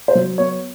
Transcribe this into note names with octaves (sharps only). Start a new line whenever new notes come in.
C5
F#3
B3 C#5